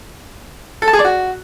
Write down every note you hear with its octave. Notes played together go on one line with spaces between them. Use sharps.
A4
A5
G#4
D5
F#4